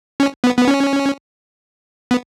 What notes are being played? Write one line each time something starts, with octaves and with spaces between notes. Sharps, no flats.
C#4
B3
B3
C#4
B3